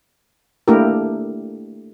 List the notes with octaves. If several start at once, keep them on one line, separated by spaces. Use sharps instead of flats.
A3 A#3 D4 E4 G4 A#4